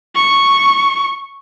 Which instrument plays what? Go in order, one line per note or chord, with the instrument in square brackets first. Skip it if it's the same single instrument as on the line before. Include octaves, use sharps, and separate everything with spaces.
[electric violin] C#6